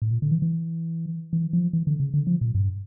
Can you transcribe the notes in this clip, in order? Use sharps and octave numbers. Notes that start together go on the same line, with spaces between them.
A2
A#2
D3
E3
E3
E3
F3
E3
D3
C#3
D3
F3
A#2
G2